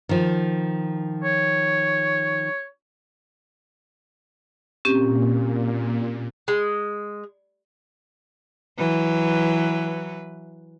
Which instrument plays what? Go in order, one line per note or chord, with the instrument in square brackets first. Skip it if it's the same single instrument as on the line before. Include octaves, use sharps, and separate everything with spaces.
[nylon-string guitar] D#3 F3
[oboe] C#5
[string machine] A#2 [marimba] C4 C#4 G4
[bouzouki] G#3
[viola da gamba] E3 F#3 B4